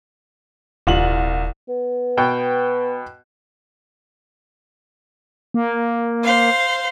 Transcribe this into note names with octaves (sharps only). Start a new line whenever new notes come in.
D#1 C2 F4 F#7
B3
B2 G5
A#3
C5 F5